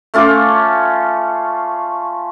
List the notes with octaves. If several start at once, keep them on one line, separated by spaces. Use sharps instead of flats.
A3 C#4 F4 D6